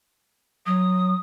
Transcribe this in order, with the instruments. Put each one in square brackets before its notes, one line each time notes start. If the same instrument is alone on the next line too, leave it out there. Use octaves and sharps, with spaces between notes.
[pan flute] F#3 [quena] D#6